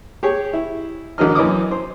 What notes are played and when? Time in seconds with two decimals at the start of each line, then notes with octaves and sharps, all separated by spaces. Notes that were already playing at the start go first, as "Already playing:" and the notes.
0.23 G4 G#4 C#5
0.53 E4
1.18 A1 D3 F#4 A#4 D#5 F6
1.35 F#2 E3 C#4 D#5 D6 D#6
1.71 C5